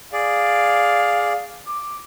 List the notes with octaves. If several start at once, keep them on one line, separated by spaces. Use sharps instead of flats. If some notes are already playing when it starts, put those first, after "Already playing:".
G#4 D5 F5
D6